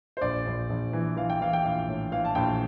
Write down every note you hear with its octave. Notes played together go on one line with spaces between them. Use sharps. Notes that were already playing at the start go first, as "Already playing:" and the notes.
C5
A#1 D5
A#1
A#1
E3
E3 F5
G5
E3 F5
G5
A#1 F5
A2
E3 F5
A5
A#1 G5